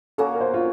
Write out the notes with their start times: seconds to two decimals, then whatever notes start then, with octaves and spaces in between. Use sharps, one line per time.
0.18 A#3 C#4 F#4 A4
0.34 A#4
0.41 C5
0.54 F4